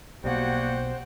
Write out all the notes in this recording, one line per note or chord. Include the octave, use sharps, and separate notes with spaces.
B1 B2 G3 A#3 F#4 C5 F#5 G5